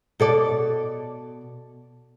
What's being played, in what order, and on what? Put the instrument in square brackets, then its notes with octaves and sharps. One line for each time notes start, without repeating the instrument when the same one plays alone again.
[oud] B2 A4 D5